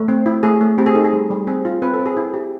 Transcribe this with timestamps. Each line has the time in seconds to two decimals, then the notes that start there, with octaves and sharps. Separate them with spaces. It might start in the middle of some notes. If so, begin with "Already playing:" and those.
Already playing: A3
0.08 C4
0.26 E4
0.43 A3 G#4
0.61 A3
0.78 C4 G4
0.86 G#4
0.95 D#4 A4
1.04 G#4
1.13 G3
1.30 G3
1.47 C4 G#4
1.65 F4
1.82 C4 B4
1.94 A4
1.99 C4
2.06 G#4
2.17 E4
2.34 G4